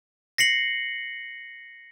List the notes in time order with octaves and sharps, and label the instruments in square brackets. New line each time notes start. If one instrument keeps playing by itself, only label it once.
[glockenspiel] A#6 C7 C#7 F#7